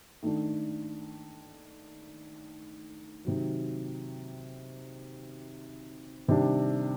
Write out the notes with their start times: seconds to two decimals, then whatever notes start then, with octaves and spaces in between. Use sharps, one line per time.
0.23 D#3 A3 D4
3.25 C3 D#3 F#3
6.28 C3 D#3 G3 D4